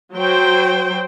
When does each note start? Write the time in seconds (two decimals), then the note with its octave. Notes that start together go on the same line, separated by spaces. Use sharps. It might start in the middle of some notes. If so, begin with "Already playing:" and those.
0.15 F#3 C5 G5